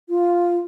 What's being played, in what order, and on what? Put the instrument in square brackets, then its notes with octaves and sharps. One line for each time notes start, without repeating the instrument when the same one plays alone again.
[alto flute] F4